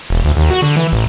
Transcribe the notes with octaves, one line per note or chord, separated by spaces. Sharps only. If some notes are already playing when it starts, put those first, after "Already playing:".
E1
D2
D#2
F#4
D3
E3
A1